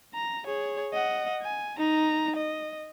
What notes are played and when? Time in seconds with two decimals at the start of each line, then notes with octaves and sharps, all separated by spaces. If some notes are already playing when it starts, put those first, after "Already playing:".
0.14 A#5
0.45 G#4 C#5
0.93 D#5 F#5
1.42 G#5
1.79 D#4 A#5
2.36 D#5